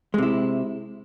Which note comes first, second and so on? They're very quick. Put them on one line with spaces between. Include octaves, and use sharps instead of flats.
G#3 C3 E4